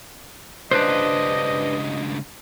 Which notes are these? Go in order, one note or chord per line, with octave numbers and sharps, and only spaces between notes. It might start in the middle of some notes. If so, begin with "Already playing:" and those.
C#2 G2 D4 B4 C5 D#5